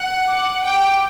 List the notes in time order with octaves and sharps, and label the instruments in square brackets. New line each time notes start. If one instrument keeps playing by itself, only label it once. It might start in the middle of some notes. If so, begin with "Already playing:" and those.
Already playing: [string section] F#5
[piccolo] D6
[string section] G5